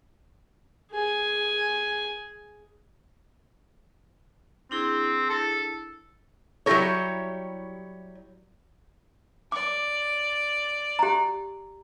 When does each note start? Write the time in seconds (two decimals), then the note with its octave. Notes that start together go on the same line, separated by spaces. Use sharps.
0.92 G#4 G#5
4.71 C4 D4 E4 G#4
5.29 A4
6.66 F#3 G3 E4 G4 A#4 C#5
9.52 D5 D6
10.99 G4 A#5